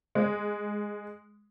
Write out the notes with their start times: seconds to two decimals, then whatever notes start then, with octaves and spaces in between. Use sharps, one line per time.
0.15 G#3